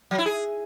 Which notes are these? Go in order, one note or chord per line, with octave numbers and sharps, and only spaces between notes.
F#3
E4
G#4